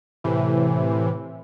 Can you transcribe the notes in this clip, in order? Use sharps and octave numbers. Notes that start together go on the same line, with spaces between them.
A2 C3 E3